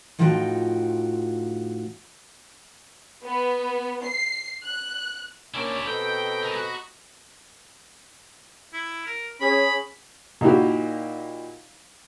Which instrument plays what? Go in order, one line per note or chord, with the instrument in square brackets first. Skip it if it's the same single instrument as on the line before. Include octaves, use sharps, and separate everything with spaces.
[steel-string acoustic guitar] A2 F3 D#4 F4 F#4 G5
[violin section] B3
C7
F#6
[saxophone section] A#3 C#4 G4 [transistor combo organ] D4 C#5 G#5 [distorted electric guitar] E4 D5
[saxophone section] B2 C4 A4 [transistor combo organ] D#5 A#5 B5 [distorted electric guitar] G5
[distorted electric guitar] A#4 G#5
F#4
[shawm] E4
A#4
[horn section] C#4 G#4 [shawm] B5
[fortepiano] A#2 D#4 E4 F#4 G4